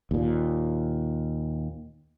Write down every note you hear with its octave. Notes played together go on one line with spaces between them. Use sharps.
D#2 A#2